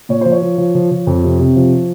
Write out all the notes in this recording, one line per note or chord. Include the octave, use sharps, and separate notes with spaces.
A#2 C#5
F3 C5
C#5
F3
F3
F3
F3
F2
C3
C3
F3